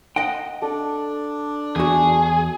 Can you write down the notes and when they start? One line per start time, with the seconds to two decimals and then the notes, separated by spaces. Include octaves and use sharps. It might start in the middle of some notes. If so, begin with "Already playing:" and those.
0.16 D#5 F#5 G5
0.62 D4 A4
1.76 E2 F#4 G#4